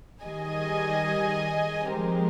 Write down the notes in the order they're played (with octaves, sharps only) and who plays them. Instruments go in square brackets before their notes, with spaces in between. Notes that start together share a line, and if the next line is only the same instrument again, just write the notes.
[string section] D#3 G3 [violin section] G#4 D#5 G#5
[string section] F3 G#3 [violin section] C4 G4 A#4